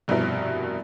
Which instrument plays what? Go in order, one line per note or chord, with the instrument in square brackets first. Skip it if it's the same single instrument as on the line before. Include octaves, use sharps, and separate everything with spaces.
[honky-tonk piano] F1 G2 B2 E4 A#4